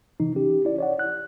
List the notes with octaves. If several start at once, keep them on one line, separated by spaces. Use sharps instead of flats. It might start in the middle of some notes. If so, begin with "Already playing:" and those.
C3 E3 D#4
C#4 G4
E4 D5
C#5 D5 F#5
F#6